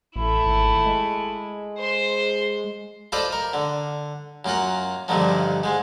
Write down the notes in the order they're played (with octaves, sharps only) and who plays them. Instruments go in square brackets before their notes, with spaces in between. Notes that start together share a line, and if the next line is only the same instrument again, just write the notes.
[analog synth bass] A1 [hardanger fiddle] A3 E4
[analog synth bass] G#1
G#3
[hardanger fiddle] C5 C6
[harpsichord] F4 A4 B4 C5 D5 D#5
A#4
D3
F#2 A#3 F4 F#5
G2 A#2 D3 D#3 F3
G#2 G#3